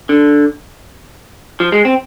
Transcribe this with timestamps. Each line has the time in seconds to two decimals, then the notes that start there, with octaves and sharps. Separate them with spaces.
0.09 D3
1.60 F3
1.72 G#3
1.85 C4